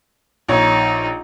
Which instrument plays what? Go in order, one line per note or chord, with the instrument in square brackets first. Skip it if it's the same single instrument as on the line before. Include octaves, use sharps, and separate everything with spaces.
[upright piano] A#1 C#5 [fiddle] D#4